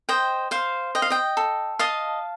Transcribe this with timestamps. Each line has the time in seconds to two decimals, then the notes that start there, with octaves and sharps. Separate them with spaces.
0.09 C5 D#5 G5
0.51 C5 F5
0.95 D#5 G5
1.02 F5
1.10 D#5 G5
1.37 A4
1.79 D#5 F5 A5